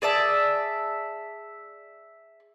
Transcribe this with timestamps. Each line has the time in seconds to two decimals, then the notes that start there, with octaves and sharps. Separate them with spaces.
0.02 G#4 D5 E5 A5